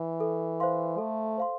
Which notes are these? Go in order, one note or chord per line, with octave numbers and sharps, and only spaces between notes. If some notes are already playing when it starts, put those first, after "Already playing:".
Already playing: E3
A4
C5 F5 C6
A3 A4
C5 F5 C6